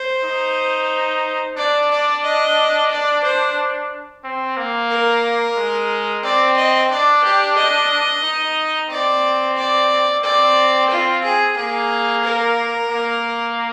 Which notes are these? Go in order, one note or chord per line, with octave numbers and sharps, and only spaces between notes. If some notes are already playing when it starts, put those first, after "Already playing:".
Already playing: C5
D#4
D4 D5
D5
D#5
D5
C5
C4
A#3
A#4
G#3
C4 D5
D#5
D4 D5
G4
D#5
D#4
C4 D5
D5
C4 D5
F4
G#4
A#3 G#4
A#4
A#3